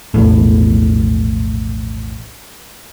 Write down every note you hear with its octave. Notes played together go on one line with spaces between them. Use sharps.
E1 A#1 E2 A2